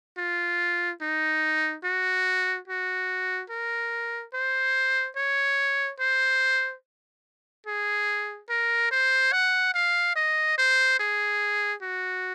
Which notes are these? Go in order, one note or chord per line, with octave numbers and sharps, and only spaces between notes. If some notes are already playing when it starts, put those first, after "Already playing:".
F4
D#4
F#4
F#4
A#4
C5
C#5
C5
G#4
A#4
C5
F#5
F5
D#5
C5
G#4
F#4